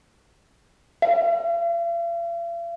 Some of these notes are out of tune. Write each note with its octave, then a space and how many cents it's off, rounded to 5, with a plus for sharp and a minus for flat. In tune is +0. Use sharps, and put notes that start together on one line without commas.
F5 -45